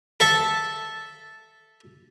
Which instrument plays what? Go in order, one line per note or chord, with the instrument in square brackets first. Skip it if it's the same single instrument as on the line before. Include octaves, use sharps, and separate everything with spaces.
[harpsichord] A4 E5 A5